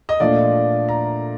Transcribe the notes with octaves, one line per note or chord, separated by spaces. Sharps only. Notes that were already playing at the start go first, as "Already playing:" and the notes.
D#5
A#2 F3 A3 D4 F4 D5
A#5